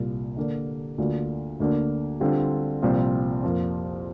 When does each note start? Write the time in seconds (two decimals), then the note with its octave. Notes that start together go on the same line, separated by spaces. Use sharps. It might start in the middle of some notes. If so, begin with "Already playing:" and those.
Already playing: C2 A#2 A#3 F4
0.37 D3 A#3 D4
0.98 D2 D3 A#3 D4 F4
1.60 D2 D3 A#3 D4
2.20 D3 G3 C4 F4
2.82 C2 A#2 F3 C4 F4
3.43 F2 F3 A#3 F4